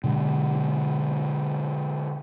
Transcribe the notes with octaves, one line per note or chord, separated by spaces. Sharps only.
B2 D3 G#3